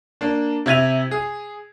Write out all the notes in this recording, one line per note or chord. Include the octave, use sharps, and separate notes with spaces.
A#3 D4
C3 E4 G#6 D#7 F7
G#4